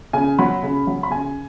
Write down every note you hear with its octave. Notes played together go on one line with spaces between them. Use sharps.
C#3 G#5
F#3 B5
C#3
F#3
B5
C#3 G#5